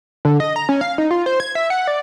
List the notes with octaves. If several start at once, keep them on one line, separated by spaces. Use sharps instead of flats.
D3
D#5
A#5
C#4
F5
D#4
F4
C5
G#6
E5
F#5
D5